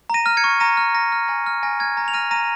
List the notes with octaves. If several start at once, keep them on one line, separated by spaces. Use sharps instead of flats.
A#5 A#6 D#7
F6
G#6 C#7
C#6
A#5 A#6 D#7
F6
A#5 A#6
F6
G#5 A#6
F6
G#5 A#6
F6 G#6
A#5 A#6
F7
F6 A#6 D#7
A#5 A#6 D#7